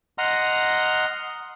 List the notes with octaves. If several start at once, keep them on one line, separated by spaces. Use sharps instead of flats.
D#5 F#5 A#5 C6 D#6 F6